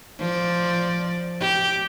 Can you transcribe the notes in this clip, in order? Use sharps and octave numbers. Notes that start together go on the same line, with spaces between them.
F3 D5
G4